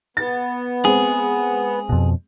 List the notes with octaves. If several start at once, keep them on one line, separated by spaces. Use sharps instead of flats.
B3 A6
G#3 C4 G#4
F2 B2